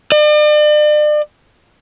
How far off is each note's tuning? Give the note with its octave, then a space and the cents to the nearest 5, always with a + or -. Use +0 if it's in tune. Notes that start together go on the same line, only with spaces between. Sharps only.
D5 +40